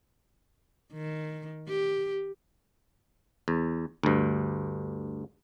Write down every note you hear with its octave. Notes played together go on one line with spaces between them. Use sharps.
D#3
G4
E2
D2 G2